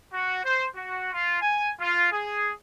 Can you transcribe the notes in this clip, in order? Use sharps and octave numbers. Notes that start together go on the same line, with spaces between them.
F#4
C5
F#4
F4
G#5
F4
G#4